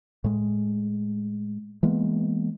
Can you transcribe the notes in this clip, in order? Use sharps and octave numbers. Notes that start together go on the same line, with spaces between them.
A2 G#3
E3 G#3 A#3 B3